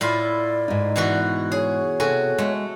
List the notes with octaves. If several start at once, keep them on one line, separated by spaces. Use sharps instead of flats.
A2 E4 F4 D5
G#2 D#4
B2 E3 F#4
G#4 C#5
C3 F#4 A4 G#5
G#3 A3